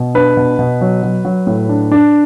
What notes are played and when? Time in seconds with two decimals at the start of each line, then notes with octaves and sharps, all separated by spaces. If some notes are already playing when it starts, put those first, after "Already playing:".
Already playing: B2
0.14 D4 B4
0.37 B2
0.59 B2
0.81 F#3
1.03 F#3
1.25 F#3
1.47 A2
1.69 D4
1.92 D4